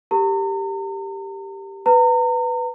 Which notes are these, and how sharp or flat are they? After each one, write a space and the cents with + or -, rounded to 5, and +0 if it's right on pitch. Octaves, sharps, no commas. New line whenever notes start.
G4 +0 A#4 -20 A#5 -40
B4 +5 A#5 -35